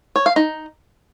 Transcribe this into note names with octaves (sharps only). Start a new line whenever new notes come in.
C#5
F5
D#4